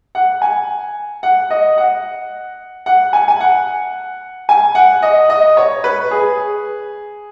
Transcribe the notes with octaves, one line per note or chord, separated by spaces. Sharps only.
F#5
G#5
F#5
D#5
F#5
F#5
G#5
G#5
F#5
G#5
F#5
D#5
D#5
C#5
B4
G#4